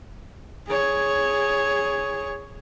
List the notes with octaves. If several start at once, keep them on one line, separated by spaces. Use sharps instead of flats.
G#4 C#5